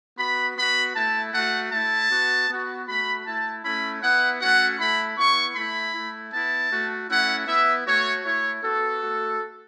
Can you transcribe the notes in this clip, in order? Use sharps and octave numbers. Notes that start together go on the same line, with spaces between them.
B3 F#4 B5
B3 F#4 B5
A3 E4 A5
A3 F#4 F#5
A3 E4 A5
B3 F#4
B3 F#4
A3 F#4 B5
A3 E4 A5
A3 C#4 E4 B5
B3 E4 F#5
A3 C#4 F#4 F#5
A3 E4 B5
B3 E4 C#6
A3 E4 B5
A3 E4
B3 E4 A5
A3 F#4
A3 C#4 E4 F#5
B3 E4 E5
A3 F#4 C#5
A3 E4 C#5
B3 F#4 A4
A3 F#4